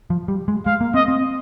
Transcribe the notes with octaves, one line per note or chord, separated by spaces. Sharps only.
F3
G3
G#3
G#3 F5
A#3
C4 D#5
C4